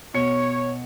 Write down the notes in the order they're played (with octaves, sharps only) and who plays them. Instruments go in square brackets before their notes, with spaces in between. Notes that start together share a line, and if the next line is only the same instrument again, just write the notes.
[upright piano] B2 C#7 [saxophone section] C#5